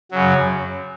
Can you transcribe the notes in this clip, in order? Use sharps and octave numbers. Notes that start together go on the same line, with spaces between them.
F#2 C#3 F#3